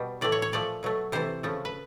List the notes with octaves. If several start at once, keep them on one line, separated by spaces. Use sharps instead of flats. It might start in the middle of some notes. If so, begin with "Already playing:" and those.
Already playing: B2 G3
A2 E3 A3 D5
C#5
C#5
A#2 F3 A3 D5
B2 F#3 A3
C3 E3 A3 C5
C#3 F3 A3
B4